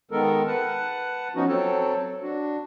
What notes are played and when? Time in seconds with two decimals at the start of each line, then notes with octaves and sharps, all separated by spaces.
0.11 D#3 G#3 B3 A4 A#4
0.47 B4 F#5 A5
1.35 F3 B3 C#4 D#4 F#4
1.48 F#3 C4 A4 C#5 A5
2.22 D4 F#4